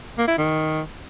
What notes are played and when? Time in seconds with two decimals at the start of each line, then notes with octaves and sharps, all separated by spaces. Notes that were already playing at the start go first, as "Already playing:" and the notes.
0.18 A#3
0.28 E4
0.38 D#3